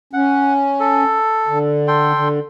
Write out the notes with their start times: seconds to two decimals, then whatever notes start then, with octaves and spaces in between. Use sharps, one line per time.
0.13 C#4 F#5
0.80 A4
1.47 D3
1.88 A4 G5 C6
2.14 D3